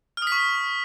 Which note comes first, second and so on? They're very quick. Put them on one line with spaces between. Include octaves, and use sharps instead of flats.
F6 D#6 B6 C#6